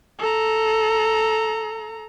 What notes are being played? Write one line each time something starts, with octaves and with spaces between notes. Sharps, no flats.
A4 A#5